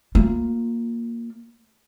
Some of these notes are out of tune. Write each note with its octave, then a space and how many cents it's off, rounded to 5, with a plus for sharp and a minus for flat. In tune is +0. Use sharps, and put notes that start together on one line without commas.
A#3 +0 F4 +25